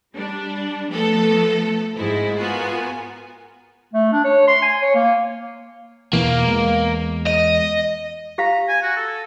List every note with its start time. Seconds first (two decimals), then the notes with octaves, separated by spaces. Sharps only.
0.16 G3 D4
0.91 F3 A3 B3 A4
1.95 G#1 G#2 G#3 E4 C5
2.38 B3 F4 F#4 A#4 G#5
3.93 A3
4.12 D4
4.24 C#5
4.48 C6
4.62 G#5
4.82 C#5
4.95 A#3
6.13 E2 B2 E3 A#3
6.47 E2 G#3 B3
7.27 D#5
8.38 G4 F5 A#5
8.68 G#5
8.82 F#4
8.96 A4